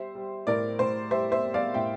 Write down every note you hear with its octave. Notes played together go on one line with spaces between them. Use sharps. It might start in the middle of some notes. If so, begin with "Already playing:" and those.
Already playing: G3 C5 E5
G3
A2 A#4 D5
A2 C5
G3 C5 E5
C5 E5
G3
D5 F5
A2 E5 G5